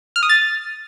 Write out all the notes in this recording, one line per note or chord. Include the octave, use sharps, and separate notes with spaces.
F6
D#6
A6